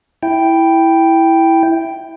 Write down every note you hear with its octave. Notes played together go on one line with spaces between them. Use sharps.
E4 G5